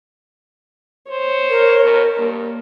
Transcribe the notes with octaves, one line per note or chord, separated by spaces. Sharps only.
C5 C#5
A#4
B2
G2 A#3